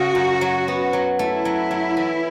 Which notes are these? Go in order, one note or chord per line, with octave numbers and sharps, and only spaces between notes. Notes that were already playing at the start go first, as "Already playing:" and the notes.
Already playing: C#3 A3 C#4 F#4
F#2
F#3
B3
F#3
A3 E4
F#3
F#3
E3